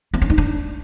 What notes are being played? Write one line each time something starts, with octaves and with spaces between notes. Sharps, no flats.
C4
C#4
D#4
D4